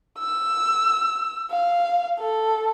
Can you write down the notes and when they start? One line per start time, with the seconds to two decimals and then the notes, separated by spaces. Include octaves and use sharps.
0.19 E6
1.51 F5
2.19 A4